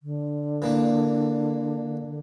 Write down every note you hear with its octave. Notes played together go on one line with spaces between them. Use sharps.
D3
E3 A#3 D4